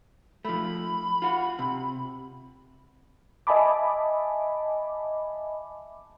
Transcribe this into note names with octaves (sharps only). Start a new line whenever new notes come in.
F3 A3 B5
F4 F#5
C3
D#5 E5 G#5 A5 B5 D6